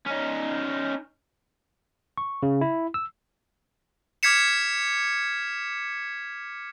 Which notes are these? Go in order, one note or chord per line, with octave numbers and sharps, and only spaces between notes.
C#4 D#4
C#6
C#3
E4
E6
D6 F6 G#6 B6 C#7 E7